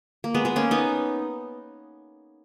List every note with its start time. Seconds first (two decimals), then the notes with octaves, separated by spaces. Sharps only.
0.24 A#3
0.34 G#3 B3
0.45 G#3 B3
0.56 A#3 C#4
0.71 B3 D#4